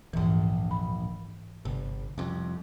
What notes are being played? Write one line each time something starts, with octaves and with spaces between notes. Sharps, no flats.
D1 A#1 G#2 E3
B5
G1 C3
C2 F2